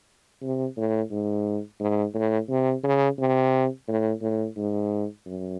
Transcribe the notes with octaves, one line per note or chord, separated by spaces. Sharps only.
C3
A2
G#2
G#2
A2
C3
C#3
C3
A2
A2
G#2
F#2